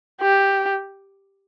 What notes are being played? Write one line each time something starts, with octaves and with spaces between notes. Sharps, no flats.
G4